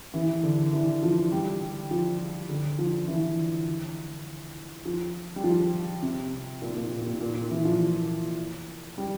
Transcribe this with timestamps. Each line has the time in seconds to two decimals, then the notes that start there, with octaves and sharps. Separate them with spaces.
0.14 E3
0.43 D3
0.73 E3
1.03 F3
1.32 G3
1.91 F3
2.49 D3
2.79 F3
3.08 E3
4.85 F3
5.36 G3
5.44 F3
6.02 C3
6.62 A#2
6.76 A#2
6.91 A#2
7.06 A#2
7.21 A#2
7.35 A#2
7.51 E3
7.65 F3
8.98 G3